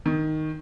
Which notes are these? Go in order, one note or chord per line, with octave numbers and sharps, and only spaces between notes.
D#3